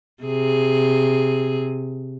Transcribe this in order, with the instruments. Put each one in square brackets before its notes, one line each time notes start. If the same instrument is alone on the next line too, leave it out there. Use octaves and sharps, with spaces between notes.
[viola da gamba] C3 G#4